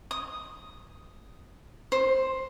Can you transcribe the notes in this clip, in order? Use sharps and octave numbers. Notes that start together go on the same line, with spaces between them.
D#6
C5